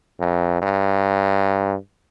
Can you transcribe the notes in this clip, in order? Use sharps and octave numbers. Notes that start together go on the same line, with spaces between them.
F2
G2